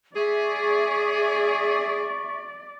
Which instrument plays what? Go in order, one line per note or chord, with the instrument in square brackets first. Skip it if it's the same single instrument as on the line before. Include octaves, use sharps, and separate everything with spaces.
[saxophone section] G#4 [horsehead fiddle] D5 [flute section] E5 C#6